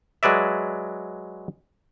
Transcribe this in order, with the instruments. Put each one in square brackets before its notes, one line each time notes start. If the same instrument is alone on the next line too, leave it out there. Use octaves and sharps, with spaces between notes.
[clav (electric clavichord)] F#3 G#3 B4 D5 E5